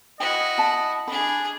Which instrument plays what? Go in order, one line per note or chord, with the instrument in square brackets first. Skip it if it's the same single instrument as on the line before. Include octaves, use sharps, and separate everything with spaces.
[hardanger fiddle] E4 F#4 [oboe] D#5 [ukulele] G5
[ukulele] A5 B5
[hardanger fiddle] D4 G#4 [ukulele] B5